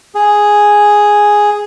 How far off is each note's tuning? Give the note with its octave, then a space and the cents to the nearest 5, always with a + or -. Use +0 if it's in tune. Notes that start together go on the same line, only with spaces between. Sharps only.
G#4 +0